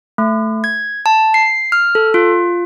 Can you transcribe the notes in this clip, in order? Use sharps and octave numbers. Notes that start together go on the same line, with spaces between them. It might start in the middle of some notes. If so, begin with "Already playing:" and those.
A3
G#6
A5
C7
F6
A4
F4